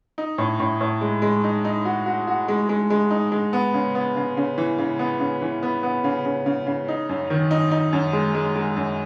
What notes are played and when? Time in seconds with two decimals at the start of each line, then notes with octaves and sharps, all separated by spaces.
0.18 D#4
0.38 A2
0.60 A2
0.81 A2
1.01 G#3
1.22 G#3
1.44 D#4
1.65 D#4
1.85 F#4
2.06 F#4
2.27 F#4
2.48 G#3
2.69 G#3
2.90 G#3
3.11 D#4
3.32 G#3
3.53 B3
3.74 C#3
3.95 B3
4.16 C#3
4.37 C#3
4.58 E3
4.78 C#3
4.99 B3
5.20 C#3
5.42 E3
5.63 B3
5.83 B3
6.04 C#3
6.25 C#3
6.46 C#3
6.67 C#3
6.88 D#4
7.09 F#2
7.30 D#3
7.51 D#4
7.71 D#4
7.93 F#2
8.13 G#3
8.35 G#3
8.56 G#3
8.76 F#2